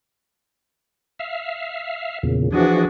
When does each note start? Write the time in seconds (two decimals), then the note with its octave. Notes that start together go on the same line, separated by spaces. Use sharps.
1.19 E5 F5
2.23 E2 A#2 C#3
2.52 E3 F3 D4 F#4 G#4